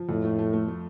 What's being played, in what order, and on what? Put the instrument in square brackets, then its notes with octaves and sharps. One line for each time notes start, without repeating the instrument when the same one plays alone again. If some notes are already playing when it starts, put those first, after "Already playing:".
Already playing: [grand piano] F3
[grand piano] F2 [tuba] A2
[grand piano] A3
A3
A3
A3